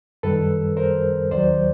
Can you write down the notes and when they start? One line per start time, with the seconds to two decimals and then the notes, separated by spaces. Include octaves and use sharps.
0.23 F#2 D#3 G3 A4 B4
0.77 A#4 C5
1.31 D#2 D#3 F#3 C5 D5